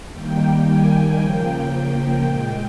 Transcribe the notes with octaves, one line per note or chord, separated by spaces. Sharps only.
D#3 G3 A#3 G5
G#5
C#3 F3 A#3 G5
A#2 G#3 G5